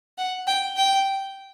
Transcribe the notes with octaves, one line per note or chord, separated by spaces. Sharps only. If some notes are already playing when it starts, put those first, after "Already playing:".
F#5
G5
G5